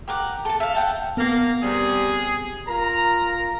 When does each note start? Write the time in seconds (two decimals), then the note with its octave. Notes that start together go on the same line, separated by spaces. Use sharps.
0.08 G4 A#4 F#5 D6
0.45 A4 A5
0.60 E5 F5
0.74 F#5 G5 A5
1.17 A#3 B3 A#4
1.62 C3 G3 G#4
2.67 F4 A#4 A#5